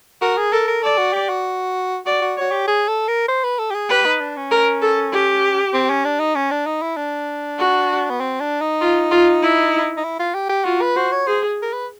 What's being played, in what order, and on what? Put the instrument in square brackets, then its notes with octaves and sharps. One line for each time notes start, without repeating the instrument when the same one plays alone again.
[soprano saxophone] F#4 [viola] A#4
[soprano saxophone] G#4
[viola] A4 [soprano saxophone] A#4
[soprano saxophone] A#4
[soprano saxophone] A4 [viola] D5
[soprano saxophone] F#4
G4
F#4
[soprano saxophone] F#4 [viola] D5
[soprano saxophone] F#4
[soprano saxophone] F#4 [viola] C#5
[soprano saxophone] G4
G#4
A4
A#4
C5
B4
A4
G4
G#4
[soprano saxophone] G4 [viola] B4
[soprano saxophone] D#4
D4
C#4
[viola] A#4
A4
G4
[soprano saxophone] C4
C#4
D4
D#4
C#4
D4
D#4
E4
D4
[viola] F#4
[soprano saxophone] B3
C4
D4
D#4
[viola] F4
F4
E4
[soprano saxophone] D#4
E4
F4
G4
G4
[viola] F4 [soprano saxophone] F#4
[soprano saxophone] B4
[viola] F#4 [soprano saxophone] C5
[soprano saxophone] C#5
[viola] G#4 [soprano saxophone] C5
[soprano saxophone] A#4
B4